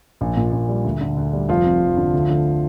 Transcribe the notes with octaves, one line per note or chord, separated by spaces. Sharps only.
A#1
A#2
A#1
G3
D2
D3
D2
G3
F1 F3 F4
F2
F1
D3
D2
D3